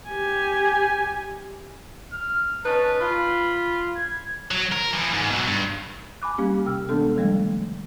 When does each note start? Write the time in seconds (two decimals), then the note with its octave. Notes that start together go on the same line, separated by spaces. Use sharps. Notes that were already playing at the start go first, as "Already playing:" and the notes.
0.10 G4 G#5
2.13 F6
2.65 C#4 D#4 B4 A5
3.01 F4 B5
3.96 G#6
4.51 F#3
4.72 A#4
4.93 E3 F3
5.13 G#2
5.30 B2 F#3
5.47 G2
6.22 G#5 B5 D6 F#6
6.38 G3 A#3 C#4 G4
6.66 C3 G5 E6 F6
6.89 E3 G#3 B3 D4 A4
7.16 D#3 F3 G3 A3 B3